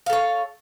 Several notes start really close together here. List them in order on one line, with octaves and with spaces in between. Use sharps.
F5 A4 C#5